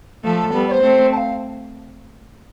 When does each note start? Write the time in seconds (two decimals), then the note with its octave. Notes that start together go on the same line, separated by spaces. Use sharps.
0.24 F3 A3 A4
0.53 G3 B3
0.68 D5
0.71 C5
0.82 A3 C4
1.12 A5
1.16 F5